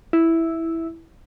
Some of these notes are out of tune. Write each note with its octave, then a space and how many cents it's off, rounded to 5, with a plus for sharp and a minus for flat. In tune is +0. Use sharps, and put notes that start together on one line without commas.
E4 -5